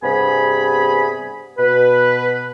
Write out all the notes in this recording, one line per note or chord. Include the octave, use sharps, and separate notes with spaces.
G2 C3 B3 G#4 G#5 B5
B2 B4